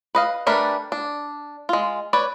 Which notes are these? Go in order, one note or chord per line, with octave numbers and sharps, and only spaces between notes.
B4 D#5 F5
G3 A3 D4 A#4 B4
D4
G#3 F4
B4 C#5 D5